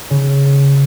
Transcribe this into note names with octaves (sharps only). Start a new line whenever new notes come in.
C#3